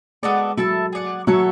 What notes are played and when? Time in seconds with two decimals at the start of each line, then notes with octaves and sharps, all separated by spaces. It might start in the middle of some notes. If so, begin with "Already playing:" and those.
0.23 G#3 B3 F#4 A4 D5
0.57 F#3 E4 A4 E5 A5
0.93 G#4 D5 F#5
1.27 F#3 F#4 A4 C#5 E5